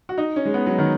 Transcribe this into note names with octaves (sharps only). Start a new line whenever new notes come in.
F#4
D#4
C#4
G#3
B3
F#3
D#3